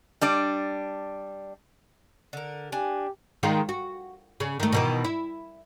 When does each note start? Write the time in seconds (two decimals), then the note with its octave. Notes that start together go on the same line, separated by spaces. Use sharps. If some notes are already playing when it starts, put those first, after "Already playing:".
0.21 G3 D4 D5
2.33 D3 A#4
2.72 D4 G4 G#5
3.43 D#3 G#3 F4
3.69 F#4
4.40 C#3
4.60 D#3 A3
4.72 B2 D#3 E3
5.04 E4